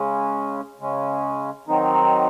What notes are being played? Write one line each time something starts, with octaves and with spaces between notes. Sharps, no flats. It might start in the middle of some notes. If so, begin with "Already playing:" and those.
Already playing: C#3 G#3 C#4
C#3 G#3 C#4
D#3 F#3 C4 D#4